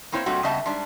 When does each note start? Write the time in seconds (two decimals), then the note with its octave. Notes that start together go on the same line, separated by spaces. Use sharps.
0.12 A#3 C4 E4 C5 C#5
0.26 A#2 G3 A3 C4 D4 F#4
0.43 C#3 G3 B3 D#5 E5 A5
0.66 G#2 G3 D4